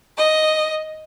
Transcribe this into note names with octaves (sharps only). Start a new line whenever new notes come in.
D#5